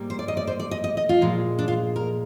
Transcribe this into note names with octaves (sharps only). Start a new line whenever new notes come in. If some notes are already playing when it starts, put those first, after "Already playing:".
Already playing: G#2 G3 A#3
C5
D5
D#5
D5
C5
D5
D#5
D#5
D#5
F4
A#2 F3 G#3
D4
F4
A#4